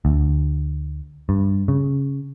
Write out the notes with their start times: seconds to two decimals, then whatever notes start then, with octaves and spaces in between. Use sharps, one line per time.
0.05 D2
1.29 G2
1.68 C#3